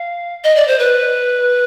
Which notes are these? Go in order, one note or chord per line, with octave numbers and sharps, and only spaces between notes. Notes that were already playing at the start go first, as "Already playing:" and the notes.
Already playing: F5
D#5
D5
C5
B4